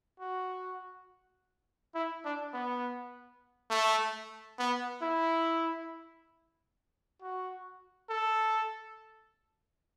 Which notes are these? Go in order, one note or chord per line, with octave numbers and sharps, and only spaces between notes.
F#4
E4
D4
B3
A3
B3
E4
F#4
A4